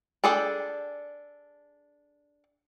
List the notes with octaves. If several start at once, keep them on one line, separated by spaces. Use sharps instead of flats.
D4 G#4 A4 D5 G5